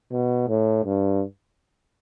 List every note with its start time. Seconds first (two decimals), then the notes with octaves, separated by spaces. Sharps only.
0.12 B2
0.48 A2
0.85 G2